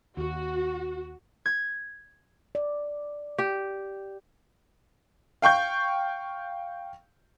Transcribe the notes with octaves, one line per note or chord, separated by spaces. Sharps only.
D#2 F#4
G#6
D5
G4
F5 G5 C#6 G6